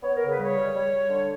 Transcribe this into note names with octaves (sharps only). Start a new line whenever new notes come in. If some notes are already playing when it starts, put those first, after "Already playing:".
B3 C#5
A#4
C#3
B4
G3 C#5
G3
G3
G3
D3